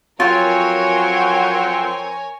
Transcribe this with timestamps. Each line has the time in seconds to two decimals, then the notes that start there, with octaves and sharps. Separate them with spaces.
0.20 F2 F#3 C4 F4 A#4 C#5 G#5